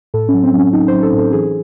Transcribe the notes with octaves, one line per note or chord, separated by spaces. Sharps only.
A2 A4
C#4
F#3
C4
F#3 C#4
F#3 D#4
F#3 C5
A4
A2 A4
E3 G#4